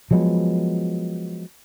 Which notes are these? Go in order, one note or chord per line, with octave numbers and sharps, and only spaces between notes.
F3 F#3 G#3 B3